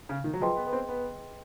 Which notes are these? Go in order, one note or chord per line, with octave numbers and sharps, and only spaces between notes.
C#3
D#3
F#3
F3 G#4 B4 D#5 G5 C6
B3
B3
C4
B3